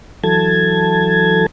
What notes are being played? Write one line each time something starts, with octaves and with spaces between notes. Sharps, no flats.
E3 F#3 A4 A5 G#6